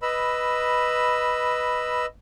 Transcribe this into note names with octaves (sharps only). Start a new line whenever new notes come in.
B4 D#5 B5 E6